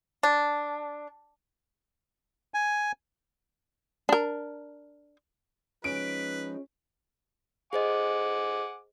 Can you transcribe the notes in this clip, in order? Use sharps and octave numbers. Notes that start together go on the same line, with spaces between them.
D4
G#5
D4 A#4
F3 G#3 C#4 D#4 B4 D7
G#4 C5 D#5 F#5 G#5 D6